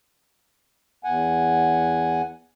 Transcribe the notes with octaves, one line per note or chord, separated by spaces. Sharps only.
E2 F#5 G#5